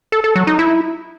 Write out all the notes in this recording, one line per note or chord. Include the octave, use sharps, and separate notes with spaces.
A4
A4
F#3
D#4
E4